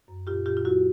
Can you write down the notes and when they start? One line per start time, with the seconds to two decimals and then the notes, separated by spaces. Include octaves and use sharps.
0.08 F#2
0.27 A#2 F4 G4
0.46 A#2 F4 G4
0.57 F4
0.64 F#3 E4 F#4